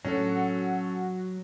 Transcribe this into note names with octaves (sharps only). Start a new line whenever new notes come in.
A2 F#3 C#4 D4 F#4 A4